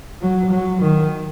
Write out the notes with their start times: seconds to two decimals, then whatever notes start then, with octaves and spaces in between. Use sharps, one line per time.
0.22 F#3
0.51 F#3
0.82 D#3